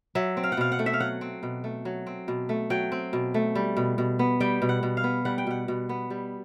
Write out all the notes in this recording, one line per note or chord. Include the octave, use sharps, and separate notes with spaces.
F#3 E5
C4
F5
F#5
B2 F5
F#5
A3
E5
F5
F#3 F#5
C4
B2
A3
F#3
C4
B2
A3
F#3 G5
C4
B2
A3
G3
B2
B2
B3
G3 G5
B2
F#5
B2
F5
B3
G3 F#5
G5
B2 F#5
B2
B3
G3